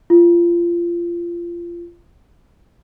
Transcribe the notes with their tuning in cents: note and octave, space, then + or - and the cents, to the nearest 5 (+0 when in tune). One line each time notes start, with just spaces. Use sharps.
F4 -25